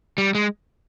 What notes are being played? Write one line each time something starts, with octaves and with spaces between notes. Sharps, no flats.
G3
G#3